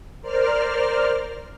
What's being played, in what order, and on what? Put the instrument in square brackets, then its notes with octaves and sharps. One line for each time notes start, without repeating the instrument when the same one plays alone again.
[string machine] A#4 C5 D5 F6